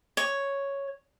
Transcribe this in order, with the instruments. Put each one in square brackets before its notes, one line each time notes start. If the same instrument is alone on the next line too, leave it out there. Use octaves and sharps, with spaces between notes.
[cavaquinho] C#5